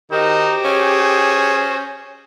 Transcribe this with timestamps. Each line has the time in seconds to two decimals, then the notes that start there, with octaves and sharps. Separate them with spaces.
0.12 D#3 D#4 F#4 G4 C5
0.65 C#4 G#4